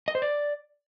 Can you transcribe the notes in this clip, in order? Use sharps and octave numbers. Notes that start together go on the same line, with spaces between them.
D#5
C5
D5